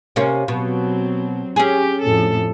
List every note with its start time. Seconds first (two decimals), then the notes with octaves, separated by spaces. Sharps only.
0.16 C3 A#3 C#4
0.48 B2 F#3 C4
1.56 C#4 G4 G#4
2.02 F2 A2 A4